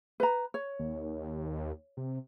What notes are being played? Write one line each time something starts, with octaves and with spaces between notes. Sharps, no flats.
B4 A#5
C#5
D#2
C3